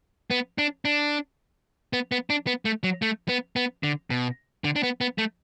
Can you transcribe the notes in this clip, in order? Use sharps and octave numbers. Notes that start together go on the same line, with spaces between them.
B3
D4
D4
B3
B3
D4
B3
A3
F#3
A3
B3
B3
D3
B2
D3
D4
B3
B3
A3